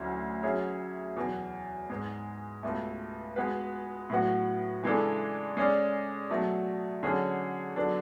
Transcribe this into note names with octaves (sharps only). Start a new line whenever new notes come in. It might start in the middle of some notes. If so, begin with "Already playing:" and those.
Already playing: D2 D3 F#3 C#4 E4
F#3 C#4 G#4 C#5 E5
E2 B2 F#3
G#2 G#3 B3
C#2 B2 A3
G#3 B3 F#4 B4
A2 F#3 B3 F#4
C#3 E3 G#3 D4 A4
G#3 C#4 G#4 D5
B2 F#3 A3
D3 F#3 C#4 G#4 C#5
D3 F#3 B3 D4 A4